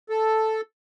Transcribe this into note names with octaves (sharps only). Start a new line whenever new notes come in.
A4